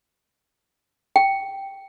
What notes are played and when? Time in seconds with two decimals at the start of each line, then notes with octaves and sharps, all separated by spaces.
1.16 G5